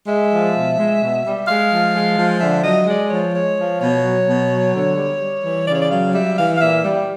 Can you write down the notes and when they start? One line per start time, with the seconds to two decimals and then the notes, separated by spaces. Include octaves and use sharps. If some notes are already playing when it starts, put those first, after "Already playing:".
0.07 G#3 E5
0.30 F3
0.53 B2
0.77 G#3
1.01 B2
1.24 G3
1.47 G#3 F5
1.70 F3
1.94 G#3
2.17 F3
2.40 D3 E5
2.63 F#3 D#5
2.86 G#3 D5
3.10 F3 C#5
3.33 G#3 C#5
3.56 F3
3.80 B2 C#5
4.04 F#3
4.26 B2
4.51 F#3
4.73 D3
4.96 G3
5.20 G3
5.44 E3
5.67 C#3 D5
5.74 C#5
5.81 D5
5.90 F#3 F5
6.13 G3 E5
6.37 E3 F5
6.55 F5
6.60 A#2 E5
6.84 G3